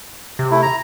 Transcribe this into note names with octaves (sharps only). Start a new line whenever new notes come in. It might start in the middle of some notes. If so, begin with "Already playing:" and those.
C3
A3 E4
A#5